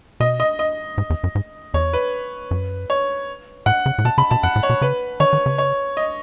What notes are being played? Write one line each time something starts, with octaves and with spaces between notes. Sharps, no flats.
B2 D#5
D#5
D#5
G#2
E2
F#2
G#2
E2 C#5
B4
F#2
C#5
A2 F#5
C#3
A2
B2 A5
C#3 B5
B2 A5
F#2 F#5
A2
C#5
B2
C#3 B4
D#3 C#5
D#3
C#3
C#5
D#5